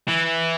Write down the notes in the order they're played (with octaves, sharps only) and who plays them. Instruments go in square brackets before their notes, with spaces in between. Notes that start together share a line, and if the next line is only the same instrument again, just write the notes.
[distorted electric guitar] E3